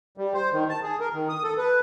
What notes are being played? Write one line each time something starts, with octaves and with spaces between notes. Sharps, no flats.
G3
C5
D#3
A5
G#4
A#4
D#3
D#6
A4
B4